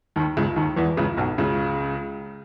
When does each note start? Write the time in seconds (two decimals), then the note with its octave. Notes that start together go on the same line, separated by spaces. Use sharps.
0.16 D#2 D#3
0.37 C#2 C#3
0.56 D#2 D#3
0.76 E2 E3
0.97 C#2 C#3
1.17 B1 B2
1.38 C#2 C#3